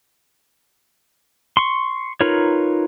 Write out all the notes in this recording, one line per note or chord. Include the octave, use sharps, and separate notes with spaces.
C6 C#6
D#4 F4 A#4 B4 C#5